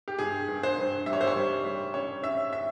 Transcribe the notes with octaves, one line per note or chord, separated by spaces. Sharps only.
G4
G2 G#4
G2
C5
G2
G3 E5
C#5
C5
C#5
G3
G3
C#4 C#5
C#4 E5
E5